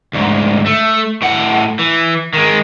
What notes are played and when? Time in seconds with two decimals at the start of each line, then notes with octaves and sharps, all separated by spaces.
0.13 D2 G#2
0.66 A3
1.22 A2 F#5
1.79 E3
2.33 D#3 G#3